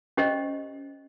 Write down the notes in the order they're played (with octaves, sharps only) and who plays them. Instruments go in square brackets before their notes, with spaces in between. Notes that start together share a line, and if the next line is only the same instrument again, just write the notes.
[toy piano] C#4 G4 C5 D#5